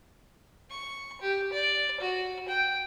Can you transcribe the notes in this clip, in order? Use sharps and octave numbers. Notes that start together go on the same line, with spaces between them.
C#6
G4
D5
F#4
G5